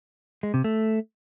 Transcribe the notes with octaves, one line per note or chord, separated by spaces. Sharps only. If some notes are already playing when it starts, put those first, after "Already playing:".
G#3
C3
A3